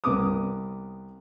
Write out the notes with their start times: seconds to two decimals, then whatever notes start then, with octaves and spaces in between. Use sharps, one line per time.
0.04 C2 B3 D6 D#6